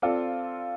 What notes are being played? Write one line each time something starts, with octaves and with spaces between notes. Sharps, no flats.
C4 F4 A4 D5